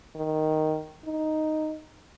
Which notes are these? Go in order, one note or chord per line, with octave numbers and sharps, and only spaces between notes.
D#3
D#4